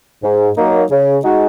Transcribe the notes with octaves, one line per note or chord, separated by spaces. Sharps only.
G#2
F#3 A#3 D#4
C#3
G#3 D#4 F#4